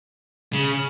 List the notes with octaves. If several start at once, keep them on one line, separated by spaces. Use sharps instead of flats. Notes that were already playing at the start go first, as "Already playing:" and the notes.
C#3